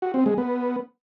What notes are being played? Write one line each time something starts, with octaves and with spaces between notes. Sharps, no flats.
F#4
C4
G#3
B3